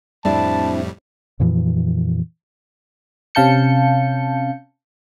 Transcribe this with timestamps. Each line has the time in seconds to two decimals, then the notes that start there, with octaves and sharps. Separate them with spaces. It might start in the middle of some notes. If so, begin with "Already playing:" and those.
0.25 F2 A2 G3 C4 D4 E4 A5
1.40 F2 A#2 E3 F3
3.35 C3 C#4 F5 A5 G6 C#7